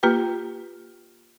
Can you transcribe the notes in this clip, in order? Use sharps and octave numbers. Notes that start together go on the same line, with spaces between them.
A#3 F4 G4 B4 G5